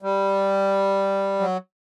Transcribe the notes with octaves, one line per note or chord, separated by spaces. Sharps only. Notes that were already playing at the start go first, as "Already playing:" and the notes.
G3
F#3